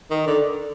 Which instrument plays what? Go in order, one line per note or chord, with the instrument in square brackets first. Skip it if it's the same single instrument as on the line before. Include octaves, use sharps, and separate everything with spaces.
[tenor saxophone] D#3
D3